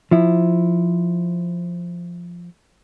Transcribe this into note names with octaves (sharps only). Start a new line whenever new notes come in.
F3 E4